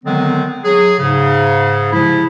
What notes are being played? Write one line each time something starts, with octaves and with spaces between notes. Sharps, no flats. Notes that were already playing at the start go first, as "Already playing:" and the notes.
D3 D#3 F#3 G#3 B3 C4
F#3 G#4
G#2 C#3
C3 F3 G#3 E4